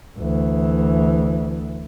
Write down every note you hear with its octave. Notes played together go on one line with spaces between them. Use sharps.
D2 E3